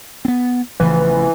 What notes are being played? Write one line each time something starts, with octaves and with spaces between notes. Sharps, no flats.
B3 C4
A1 C#3 E3 F3